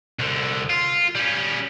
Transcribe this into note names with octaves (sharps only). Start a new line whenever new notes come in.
C2 D3
F4
G3 C#4